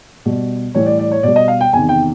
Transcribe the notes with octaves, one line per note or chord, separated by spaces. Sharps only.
B2 G3
A2 E3 G3 C#5
D5
D5
C#5
B2 G3 D5
D#5
F5
G5
E2 C3 D#3 G#5
G5